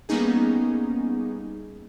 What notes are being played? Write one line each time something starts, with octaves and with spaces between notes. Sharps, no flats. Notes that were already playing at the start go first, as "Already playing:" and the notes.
G3 A#3 B3 C#4 D#4 G#4